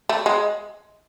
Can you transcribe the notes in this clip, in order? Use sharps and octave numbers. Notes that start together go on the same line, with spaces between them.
A3
G#3